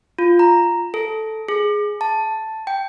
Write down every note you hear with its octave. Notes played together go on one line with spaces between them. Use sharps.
F4
A#5
A4
G#4
A5
G5